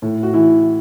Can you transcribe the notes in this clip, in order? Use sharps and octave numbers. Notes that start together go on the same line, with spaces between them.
A2
F#4
E3 E4